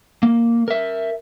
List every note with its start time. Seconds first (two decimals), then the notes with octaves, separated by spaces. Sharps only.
0.23 A#3
0.68 A#4 E5